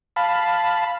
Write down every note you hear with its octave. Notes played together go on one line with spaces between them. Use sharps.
F5 A5 B5